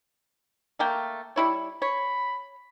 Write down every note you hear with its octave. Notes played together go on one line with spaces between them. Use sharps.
A3 A#3 G5
G3 E4 C#5
C#5 B5